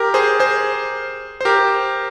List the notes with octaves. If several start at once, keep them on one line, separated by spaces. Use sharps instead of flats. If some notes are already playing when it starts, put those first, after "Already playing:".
Already playing: G4 A#4
G#4 C5
G#4 C5
C5
G4 A#4